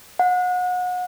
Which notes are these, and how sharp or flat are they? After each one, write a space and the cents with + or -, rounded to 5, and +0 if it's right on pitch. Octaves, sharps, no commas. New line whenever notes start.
F#5 -35